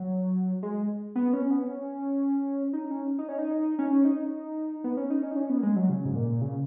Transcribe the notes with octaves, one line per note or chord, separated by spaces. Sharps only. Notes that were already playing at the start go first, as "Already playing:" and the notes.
Already playing: F#3
G#3
B3
C#4
B3
C#4
D#4
C#4
D#4
C#4
D#4
C#4
D#4
B3
C#4
D#4
C#4
D#4
C#4
B3
A#3
G#3
F#3
C#3
G#2
A#2
C#3